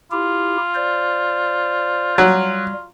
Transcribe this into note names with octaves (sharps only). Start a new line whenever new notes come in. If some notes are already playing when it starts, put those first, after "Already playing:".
E4 F4 G4
C5 D5
F#3 G3